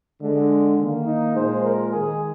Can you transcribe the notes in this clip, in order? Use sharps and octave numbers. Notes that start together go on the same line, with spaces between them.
D3 G#3
D#3 A#3
D#4
A#2 F3 G#3 C5
A#4
D#3 G#3 G#4